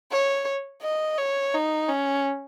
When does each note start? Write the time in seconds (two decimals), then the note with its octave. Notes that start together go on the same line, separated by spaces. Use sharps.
0.11 C#5
0.82 D#5
1.18 C#5
1.54 D#4
1.89 C#4